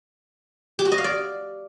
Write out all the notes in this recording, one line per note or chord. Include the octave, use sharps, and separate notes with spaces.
G4
F#4
D#5
F5
D5